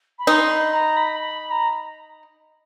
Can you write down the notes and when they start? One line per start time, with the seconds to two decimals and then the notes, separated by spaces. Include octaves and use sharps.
0.18 B5
0.27 D#4 C6
0.50 B5
0.73 A#5
0.96 B5
1.19 B5
1.51 A#5